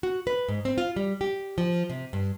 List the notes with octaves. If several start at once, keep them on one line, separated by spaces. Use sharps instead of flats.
F#4
B4
G#2
C4
F4
G3
G4
F3
C3
G2